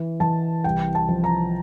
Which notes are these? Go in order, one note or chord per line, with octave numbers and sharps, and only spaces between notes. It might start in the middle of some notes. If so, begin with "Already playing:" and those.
Already playing: E3
E3 A5
C2 G5
A5
F3
A#5